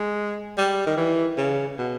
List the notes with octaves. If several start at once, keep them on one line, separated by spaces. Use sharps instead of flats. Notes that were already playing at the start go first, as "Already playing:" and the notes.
Already playing: G#3
G3
D#3
E3
C#3
B2